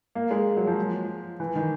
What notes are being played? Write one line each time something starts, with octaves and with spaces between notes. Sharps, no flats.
A#3
G#3
F#3
F3
E3
D#3